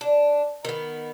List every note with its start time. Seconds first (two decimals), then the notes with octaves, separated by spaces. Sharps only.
0.01 D4
0.65 D#3 B3